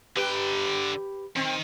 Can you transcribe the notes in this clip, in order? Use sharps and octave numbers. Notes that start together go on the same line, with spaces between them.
D3 G4 B4 G5
D#3 C4